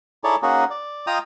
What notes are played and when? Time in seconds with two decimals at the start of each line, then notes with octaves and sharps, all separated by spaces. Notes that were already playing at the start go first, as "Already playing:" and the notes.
0.24 D#4 E4 G#4 A4 C#5 D5
0.43 A#3 C#4 D#4 F#4 G#4
0.70 D5
1.07 F4 D#5 G5 A#5 D#6